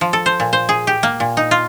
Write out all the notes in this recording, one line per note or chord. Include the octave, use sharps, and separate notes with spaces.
F3
A4
C5
A#2
C5
G#4
G4
A#3
A#2
D#4
F4